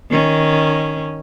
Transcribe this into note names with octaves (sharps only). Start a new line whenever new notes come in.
D#3 C#4